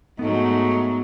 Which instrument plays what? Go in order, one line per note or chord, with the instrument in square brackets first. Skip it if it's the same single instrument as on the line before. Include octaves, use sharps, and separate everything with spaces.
[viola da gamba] G#2 F#3 [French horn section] A3 D#4 [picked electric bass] B3